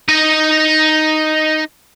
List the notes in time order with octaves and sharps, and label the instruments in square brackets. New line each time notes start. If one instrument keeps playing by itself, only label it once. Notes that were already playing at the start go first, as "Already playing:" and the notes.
[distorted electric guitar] D#4 D#5